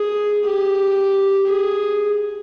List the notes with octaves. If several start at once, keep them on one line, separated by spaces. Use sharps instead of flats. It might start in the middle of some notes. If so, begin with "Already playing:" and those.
Already playing: G#4
G4
G#4